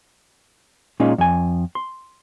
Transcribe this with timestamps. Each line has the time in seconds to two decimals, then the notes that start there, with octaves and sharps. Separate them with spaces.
1.00 A#2 G#3 A#3 C#4 D#4 F4
1.18 F2 G#5
1.75 C6